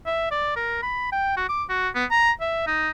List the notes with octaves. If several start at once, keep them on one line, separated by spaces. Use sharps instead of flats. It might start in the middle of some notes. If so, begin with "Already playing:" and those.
E5
D5
A#4
B5
G5
F#4
D6
F#4
B3
A#5
E5
D#4